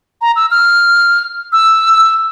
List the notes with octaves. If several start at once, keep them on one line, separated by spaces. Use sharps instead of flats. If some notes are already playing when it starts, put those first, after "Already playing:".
A#5
E6
F6
E6